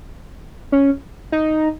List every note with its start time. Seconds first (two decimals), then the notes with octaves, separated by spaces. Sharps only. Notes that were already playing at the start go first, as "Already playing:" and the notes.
0.72 C#4
1.32 D#4